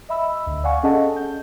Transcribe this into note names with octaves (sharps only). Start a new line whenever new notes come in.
D#5 E5 B5 E6
D2
D5 F5 F#5 G#5 C#6
C#4 G#4 A4 D#5 F#5 A5
G6